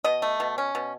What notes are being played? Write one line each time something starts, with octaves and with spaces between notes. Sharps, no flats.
B2 D#5
A3
B2
C#4
B2